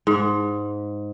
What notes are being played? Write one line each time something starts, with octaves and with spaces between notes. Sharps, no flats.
G#2